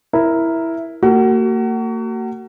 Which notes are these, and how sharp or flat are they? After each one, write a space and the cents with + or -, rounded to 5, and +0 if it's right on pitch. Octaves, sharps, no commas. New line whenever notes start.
E4 +0 A#4 +0
A#3 -40 F#4 +30